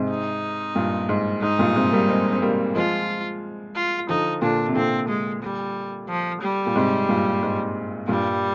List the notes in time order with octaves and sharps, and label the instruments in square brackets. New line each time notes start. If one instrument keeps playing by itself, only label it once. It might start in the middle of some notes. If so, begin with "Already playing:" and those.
Already playing: [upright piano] G#2 C3
[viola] D#4
[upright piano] G2 A#2
G#2
[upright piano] G#2 [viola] D#4
[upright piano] G2 A#2
G#2 C3
G3 A#3
G#3 C4
C4
G3 A#3
[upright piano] F3 G#3 [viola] F4
[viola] F4
[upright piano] D3 F3 [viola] D#4
[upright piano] A#2 D3 [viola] D4
[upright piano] C3
[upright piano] A#2 D3 [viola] C4
[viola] G#3
G3
F3
G3
[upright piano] A#2
G#2 C3
G2 A#2
G#2
[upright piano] G2 A#2 [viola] G3